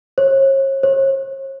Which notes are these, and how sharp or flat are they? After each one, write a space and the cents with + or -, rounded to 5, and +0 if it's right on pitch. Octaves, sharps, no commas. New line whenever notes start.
C#5 -40
C#5 -45